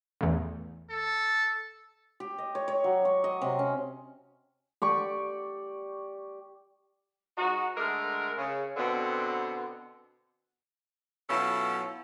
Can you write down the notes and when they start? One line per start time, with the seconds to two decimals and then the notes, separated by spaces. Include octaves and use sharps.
0.21 A1 E2
0.90 A4
2.20 G4
2.38 D#5
2.55 C#5
2.68 C#5
2.84 F#3
3.05 C#6
3.24 D#5
3.42 C3
3.59 C#4
4.82 G4 D5 C#6
7.38 G#2 D#4 F#4
7.77 D3 G#3 A3 A#4
8.38 C#3
8.77 B2 D3 B3 C4
11.29 B2 F#3 C#4 E4 F4 A4